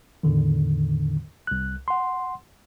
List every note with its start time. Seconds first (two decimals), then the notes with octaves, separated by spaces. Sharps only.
0.23 E2 A2 D3 D#3
1.47 C2 F#6
1.88 F#5 C6